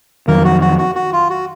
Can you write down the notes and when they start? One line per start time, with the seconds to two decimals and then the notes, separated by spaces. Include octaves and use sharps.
0.28 F2 D#3 F#3 A#3 A#4
0.45 F#4
0.61 F#4
0.78 F#4
0.95 F#4
1.13 F4
1.30 F#4